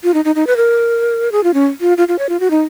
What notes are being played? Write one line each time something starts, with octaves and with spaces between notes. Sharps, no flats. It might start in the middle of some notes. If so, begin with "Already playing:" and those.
F4
D#4
D#4
D#4
B4
A#4
G#4
F4
C#4
F4
F4
F4
C#5
F4
F#4
D#4